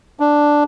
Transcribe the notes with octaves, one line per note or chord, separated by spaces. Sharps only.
D4